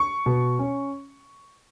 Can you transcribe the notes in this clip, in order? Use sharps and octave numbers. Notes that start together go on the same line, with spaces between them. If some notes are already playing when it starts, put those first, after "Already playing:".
Already playing: C#6
B2
C#4